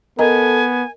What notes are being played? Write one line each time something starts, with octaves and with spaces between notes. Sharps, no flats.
B3 A4 A#4 D#5 G#5 A#5